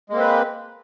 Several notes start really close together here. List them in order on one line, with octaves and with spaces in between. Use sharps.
G#3 A#3 C4 B4